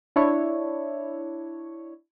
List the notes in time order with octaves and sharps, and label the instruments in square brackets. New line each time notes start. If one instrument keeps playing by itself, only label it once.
[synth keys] D4 E4 C#5